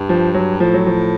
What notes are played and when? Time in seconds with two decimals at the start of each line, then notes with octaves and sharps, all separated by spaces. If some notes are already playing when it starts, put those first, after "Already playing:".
Already playing: G2
0.09 F3
0.34 F#3
0.60 A2 F3
0.74 F#3
0.87 F3